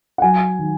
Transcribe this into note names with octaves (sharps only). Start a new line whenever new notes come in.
F#5
F#3 G#5
D#3